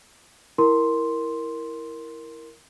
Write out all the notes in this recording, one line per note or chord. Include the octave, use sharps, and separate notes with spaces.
E4 A#4 C6